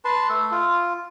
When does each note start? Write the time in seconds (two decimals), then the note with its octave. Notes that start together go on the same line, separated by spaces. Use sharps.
0.05 B4 A5 C6
0.29 A3 A4
0.51 F4